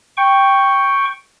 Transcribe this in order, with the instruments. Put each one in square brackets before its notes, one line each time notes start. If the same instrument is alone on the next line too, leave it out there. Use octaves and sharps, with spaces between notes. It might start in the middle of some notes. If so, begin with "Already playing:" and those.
[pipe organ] G5 C#6